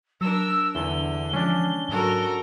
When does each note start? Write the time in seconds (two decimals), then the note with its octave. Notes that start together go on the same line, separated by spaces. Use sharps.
0.21 F#3 D4 A#4 E6
0.75 E2 D3 G7
1.33 E3 F3 G#3 C#4 D4
1.89 G#2 F#3 F#4 A4 A#4